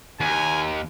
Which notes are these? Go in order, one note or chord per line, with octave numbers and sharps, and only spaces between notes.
D#2 G#5